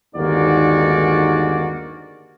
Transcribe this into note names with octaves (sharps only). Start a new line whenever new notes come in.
G1 D#2 G#2 A#3 F#4 D5